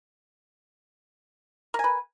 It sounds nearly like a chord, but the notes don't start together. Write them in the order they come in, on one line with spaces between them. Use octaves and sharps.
A#4 G#5 B4